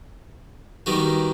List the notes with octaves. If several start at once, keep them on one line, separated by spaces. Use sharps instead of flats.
D#3 G3 B3 D#4 F#4